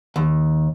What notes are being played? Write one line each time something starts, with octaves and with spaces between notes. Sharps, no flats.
D#2